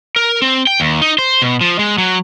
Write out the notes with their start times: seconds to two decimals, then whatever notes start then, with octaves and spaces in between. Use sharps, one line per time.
0.16 A#4
0.42 C4
0.67 G5
0.80 D#2
1.02 D#4
1.19 C5
1.42 B2
1.61 F3
1.79 G#3
1.98 F#3